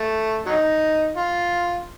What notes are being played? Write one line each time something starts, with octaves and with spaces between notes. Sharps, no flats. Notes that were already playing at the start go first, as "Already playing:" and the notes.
Already playing: A3
F#3 D#4
F4